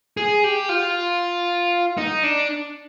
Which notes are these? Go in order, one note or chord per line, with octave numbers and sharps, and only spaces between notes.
G#4
G4
F4
D#4
D4